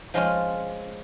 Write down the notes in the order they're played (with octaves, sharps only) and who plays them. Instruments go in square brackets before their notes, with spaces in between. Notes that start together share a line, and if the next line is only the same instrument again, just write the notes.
[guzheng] F3 G#3 C#4 F4